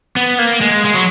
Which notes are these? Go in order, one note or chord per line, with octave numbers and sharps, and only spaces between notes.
B3
A#3
G#3
G#3
F#3